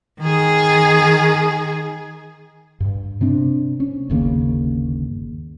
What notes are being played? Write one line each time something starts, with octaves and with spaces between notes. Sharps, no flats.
D#3 G#4
G2
C3 C4 D4
C#4
G1 D#2 C#3 A#3